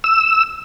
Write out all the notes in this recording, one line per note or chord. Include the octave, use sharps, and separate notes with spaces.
E6